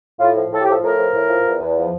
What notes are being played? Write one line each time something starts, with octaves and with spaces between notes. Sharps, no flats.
A2 F4
F3
A2 A4
G4
F3 A4
A2 A#4
F3
A2
F3
E2
E2
F3